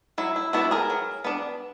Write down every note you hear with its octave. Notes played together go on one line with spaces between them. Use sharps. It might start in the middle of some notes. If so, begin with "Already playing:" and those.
F#3 E4
E4
B3 D4 E4 F#4
G#4 A#4
F#3
B3 D4